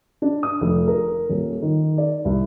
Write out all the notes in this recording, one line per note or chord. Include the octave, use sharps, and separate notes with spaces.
D4
D#6
F1
A#4
D#1
D#3
D5
C2